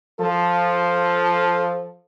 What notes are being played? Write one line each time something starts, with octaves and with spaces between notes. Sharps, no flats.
F3 A4